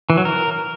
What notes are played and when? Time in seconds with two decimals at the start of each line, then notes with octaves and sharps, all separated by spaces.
0.10 E3
0.17 F#3
0.25 A#4